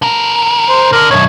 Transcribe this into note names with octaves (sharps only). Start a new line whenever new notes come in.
D3 A#4
C5
D3 A#4
B1 F#2 C#5